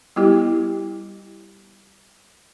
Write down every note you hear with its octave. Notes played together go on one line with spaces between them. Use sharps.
G3 B3 E4 G4